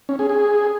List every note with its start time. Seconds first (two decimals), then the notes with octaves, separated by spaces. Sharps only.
0.09 C#4
0.19 G#4
0.29 G#4